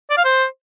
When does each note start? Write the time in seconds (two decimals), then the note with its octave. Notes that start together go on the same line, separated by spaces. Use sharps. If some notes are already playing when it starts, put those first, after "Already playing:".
0.10 D5
0.18 F5
0.25 C5